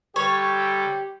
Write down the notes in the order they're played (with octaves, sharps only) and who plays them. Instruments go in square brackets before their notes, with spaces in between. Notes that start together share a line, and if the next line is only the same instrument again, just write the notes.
[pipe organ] D3 G3 A4 [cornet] G4 [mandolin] C#5